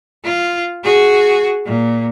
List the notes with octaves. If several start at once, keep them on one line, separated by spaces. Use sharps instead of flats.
F4
F#4 G#4
A#2